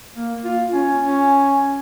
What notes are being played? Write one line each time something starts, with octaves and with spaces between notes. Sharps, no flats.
A#3
F4
C#4
C#4